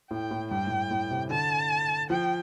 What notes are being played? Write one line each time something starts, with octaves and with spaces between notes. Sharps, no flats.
A2 G5
A2
G2 G5
A2
G2
A2
C3
D3 A5
F3 G5